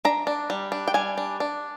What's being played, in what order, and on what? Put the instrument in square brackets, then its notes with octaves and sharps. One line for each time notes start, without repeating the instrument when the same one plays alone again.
[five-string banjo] D4 A#5
D4
G3
D4
G5
G3 G#5
D4
D4